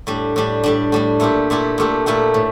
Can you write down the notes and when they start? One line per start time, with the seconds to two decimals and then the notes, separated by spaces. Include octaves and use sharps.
0.07 A2 G3 D4
0.36 A2 G3 D4
0.63 A2 G3 D4
0.92 A2 G3 D4
1.20 A#2 A3 E4 G4
1.50 A#2 A3 E4 G4
1.78 A#2 A3 E4 G4
2.06 A#2 A3 E4 G4
2.34 A2